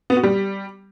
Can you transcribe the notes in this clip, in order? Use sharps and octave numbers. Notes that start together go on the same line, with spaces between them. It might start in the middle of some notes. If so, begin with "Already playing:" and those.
B3
F#4
G3